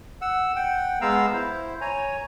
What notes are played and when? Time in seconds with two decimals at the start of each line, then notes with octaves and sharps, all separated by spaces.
0.21 F#5 E6
0.56 F#5 G5
1.01 G#3 B3 F5 A#5 E6
1.33 E4 C5
1.81 C#5 G#5 A#5